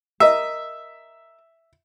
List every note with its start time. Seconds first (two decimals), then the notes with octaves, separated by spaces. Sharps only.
0.20 A#4 D#5 E5